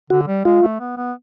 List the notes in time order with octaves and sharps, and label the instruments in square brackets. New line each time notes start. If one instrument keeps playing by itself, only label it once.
[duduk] D3 [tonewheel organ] F#4
[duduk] G3
[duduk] G#3 [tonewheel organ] F4
[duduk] A3
B3
B3